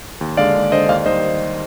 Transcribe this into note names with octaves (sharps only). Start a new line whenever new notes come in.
D#2
D3 G#3 D5 F5
D#2
D3 G#3 C5 D#5
D#2 D5 F5
D#3 G3 C5 D#5